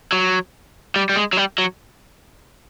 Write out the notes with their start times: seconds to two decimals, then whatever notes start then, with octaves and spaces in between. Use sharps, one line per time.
0.12 F#3
0.96 G3
1.09 G3
1.16 G#3
1.33 F#3
1.37 G3
1.58 F#3